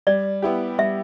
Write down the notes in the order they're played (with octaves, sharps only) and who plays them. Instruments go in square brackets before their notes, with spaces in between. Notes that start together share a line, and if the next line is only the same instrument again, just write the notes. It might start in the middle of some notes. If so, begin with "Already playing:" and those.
[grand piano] G3 [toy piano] D5
[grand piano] B3 E4 G4
[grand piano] G3 [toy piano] E5